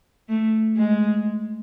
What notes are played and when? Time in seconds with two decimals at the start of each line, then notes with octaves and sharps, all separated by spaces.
0.29 A3
0.77 G#3